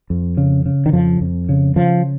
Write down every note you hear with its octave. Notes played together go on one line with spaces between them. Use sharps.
F2
C#3
C#3
D#3
F2 F3
F2
C#3
C#3 F3